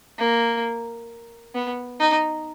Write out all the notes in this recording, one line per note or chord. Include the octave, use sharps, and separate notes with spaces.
A#3
B3
D#4